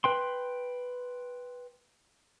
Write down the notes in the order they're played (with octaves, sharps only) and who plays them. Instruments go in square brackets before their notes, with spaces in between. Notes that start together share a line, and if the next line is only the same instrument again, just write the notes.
[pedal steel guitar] B4 G5 C6